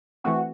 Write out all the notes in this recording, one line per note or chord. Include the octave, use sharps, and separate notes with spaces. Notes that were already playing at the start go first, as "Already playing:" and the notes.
E3 A3 C4 F#4